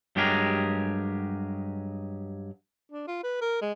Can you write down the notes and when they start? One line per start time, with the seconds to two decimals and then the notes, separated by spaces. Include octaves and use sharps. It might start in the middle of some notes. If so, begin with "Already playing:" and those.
0.16 G2 F#3 G#3 G4 G#4 A#4
2.92 D4
3.08 F4
3.24 B4
3.41 A#4
3.62 G#3